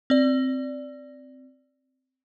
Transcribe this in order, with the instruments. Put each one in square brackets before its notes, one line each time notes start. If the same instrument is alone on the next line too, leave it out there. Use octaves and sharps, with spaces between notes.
[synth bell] C4 D5